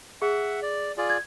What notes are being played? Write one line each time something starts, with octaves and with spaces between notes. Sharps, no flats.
G#4 E5 F#5
D5
F4 G#4 D5
G#6